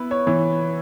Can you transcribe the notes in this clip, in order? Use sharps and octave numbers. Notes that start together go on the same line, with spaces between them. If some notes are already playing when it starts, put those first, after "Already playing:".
Already playing: B3 E4 B4
C#5
E3